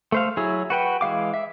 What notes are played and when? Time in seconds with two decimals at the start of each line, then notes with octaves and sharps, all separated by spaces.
0.12 A3 C5 F5
0.37 F#3 E4 G#4
0.70 F#4 B4 G5
1.01 E3 G#3 F5 D6
1.34 E5